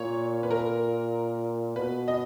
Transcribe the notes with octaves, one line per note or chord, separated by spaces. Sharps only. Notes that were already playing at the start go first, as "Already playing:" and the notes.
Already playing: A#2 C#5
B4
A#4
B2 B4
D#5